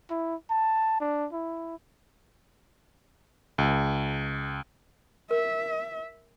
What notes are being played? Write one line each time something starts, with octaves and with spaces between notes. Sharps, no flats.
E4
A5
D4
E4
C#2
A#4 E5